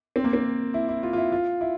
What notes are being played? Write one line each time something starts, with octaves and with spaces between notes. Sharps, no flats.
C4
A#3
C4
E4
E4
F4
F4
E4
F4
E4